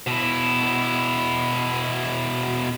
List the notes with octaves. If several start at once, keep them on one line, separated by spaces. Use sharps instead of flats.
B2 E4